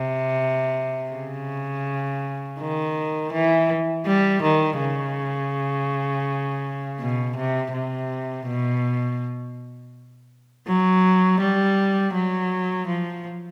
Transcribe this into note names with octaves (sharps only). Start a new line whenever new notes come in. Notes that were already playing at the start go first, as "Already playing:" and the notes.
Already playing: C3
C#3
D#3
E3
G3
D#3
C#3
B2
C3
C3
B2
F#3
G3
F#3
F3